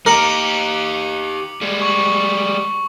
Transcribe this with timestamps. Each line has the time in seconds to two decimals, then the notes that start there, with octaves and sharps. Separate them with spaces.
0.06 D#4 G4 A#4 D6 C#7 F#7
1.61 G3 G#3
1.82 C#6 F#7